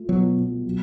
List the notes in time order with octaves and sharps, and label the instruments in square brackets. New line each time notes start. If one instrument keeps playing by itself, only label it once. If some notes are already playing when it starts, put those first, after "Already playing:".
Already playing: [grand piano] A3 F4
[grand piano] B2 [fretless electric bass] F#3
[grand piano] B2
F#3